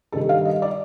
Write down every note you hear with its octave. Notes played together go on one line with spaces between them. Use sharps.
G2 D#3 G3 A4
F5
D#5
D5